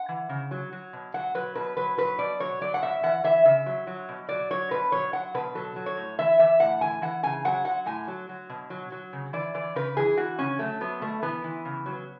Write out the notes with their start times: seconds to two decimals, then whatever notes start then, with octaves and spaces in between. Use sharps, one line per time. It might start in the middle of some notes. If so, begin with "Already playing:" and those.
Already playing: F#5
0.09 E3
0.29 C#3
0.51 F#3
0.73 F#3
0.93 B2
1.14 F#3 F#5
1.34 F#3 B4
1.55 B2 B4
1.77 F#3 B4
1.97 F#3 B4
2.18 B2 D5
2.40 F#3 C#5
2.61 F#3 D5
2.74 F#5
2.82 B2 E5
3.03 E3 F#5
3.24 E3 E5
3.45 C#3 E5
3.66 F#3
3.87 F#3
4.09 B2
4.29 F#3 D5
4.51 F#3 C#5
4.71 B2 B4
4.92 F#3 C#5
5.13 F#3 F#5
5.34 B2 B4
5.55 F#3 A4
5.76 F#3
5.86 C#5
5.97 A2
6.19 E3 E5
6.39 E3 E5
6.60 A2 F#5
6.81 E3 G#5
7.02 E3 F#5
7.23 C#3 G#5
7.45 F#3 F#5
7.65 F#3 F#5
7.86 A2 G#5
8.08 F#3
8.29 F#3
8.50 B2
8.70 F#3
8.92 F#3
9.13 C#3
9.33 E3 D5
9.54 E3 D5
9.76 C#3 B4
9.97 E3 G#4
10.17 E3 F#4
10.38 C#3 C#4
10.59 F#3 A3
10.81 F#3 B3
11.01 B2 A3
11.22 E3 B3
11.44 E3
11.65 C#3
11.86 F#3